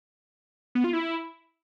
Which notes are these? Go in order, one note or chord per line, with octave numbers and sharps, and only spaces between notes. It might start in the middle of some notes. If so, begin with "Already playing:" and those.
B3
F4
E4